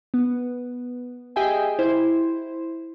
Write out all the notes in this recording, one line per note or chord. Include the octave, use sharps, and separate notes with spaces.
B3
G4 G#4 D#5 E5 G5 G#5
E4 C5